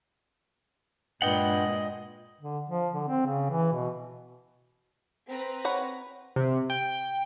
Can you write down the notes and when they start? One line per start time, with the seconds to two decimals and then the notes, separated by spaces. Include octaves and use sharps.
1.22 G2 A#2 G#3 D#5 F#5 G5
2.41 D3
2.69 F3
2.94 D3
3.08 C4
3.26 C#3
3.50 E3
3.73 B2
5.29 C4 B4 A#5
5.65 C#5 F#5 B5
6.36 C3
6.70 G5